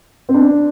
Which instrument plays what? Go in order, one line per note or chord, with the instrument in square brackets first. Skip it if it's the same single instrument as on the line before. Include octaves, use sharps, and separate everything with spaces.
[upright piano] C4
D4